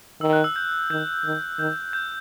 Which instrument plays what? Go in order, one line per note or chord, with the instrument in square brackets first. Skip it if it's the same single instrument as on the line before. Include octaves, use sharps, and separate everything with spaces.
[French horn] D#3 [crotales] E6
[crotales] F#6
E6
G6
[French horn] D#3 [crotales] G6
[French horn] D#3
[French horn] D#3 [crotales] G6
[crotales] G6